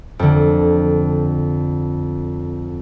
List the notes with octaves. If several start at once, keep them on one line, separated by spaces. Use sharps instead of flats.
F2 D3